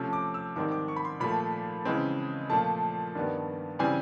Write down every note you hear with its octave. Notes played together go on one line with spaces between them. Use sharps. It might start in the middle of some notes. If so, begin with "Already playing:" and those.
Already playing: C3 F3 A3 C#4 E6
D6
E6
G#2 D#3 G3 C4 D6
D6
C#6
B5
C6
A#2 F3 A3 B5
C#3 E3 G#3 C4
A#2 F3 A3 A5
G2 D#3 G3 B3
C#3 E3 G3 C4 G#5